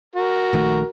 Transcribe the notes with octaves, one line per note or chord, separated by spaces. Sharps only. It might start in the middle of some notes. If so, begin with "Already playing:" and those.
F#4 A#4
A#1 D#3 A3